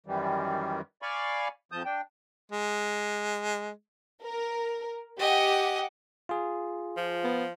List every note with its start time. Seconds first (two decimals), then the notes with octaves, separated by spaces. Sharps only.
0.06 F#2 D#3 E3 G3
1.02 D5 F5 G#5 B5 C#6
1.72 F2 F3 A5 D#6 G6
1.85 D4 G5
2.52 G#3
4.23 A#4
5.19 G4 D#5 F#5 G#5
6.29 F4 G#4
6.97 F3
7.24 B3